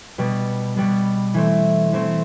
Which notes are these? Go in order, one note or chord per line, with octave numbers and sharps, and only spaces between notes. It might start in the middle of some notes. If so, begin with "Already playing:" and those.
B2 G3 B3
B2 G3 B3
E3 A3 C4
E3 A3 C4